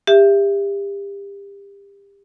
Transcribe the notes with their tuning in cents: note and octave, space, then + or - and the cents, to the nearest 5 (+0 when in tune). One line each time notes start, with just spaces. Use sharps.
G4 +30 E5 +20